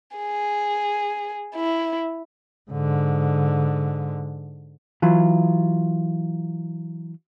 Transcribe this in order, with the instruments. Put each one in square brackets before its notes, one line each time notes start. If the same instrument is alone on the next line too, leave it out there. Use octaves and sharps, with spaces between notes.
[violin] G#4
E4
[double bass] G#2 D3
[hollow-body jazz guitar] E3 F#3 F4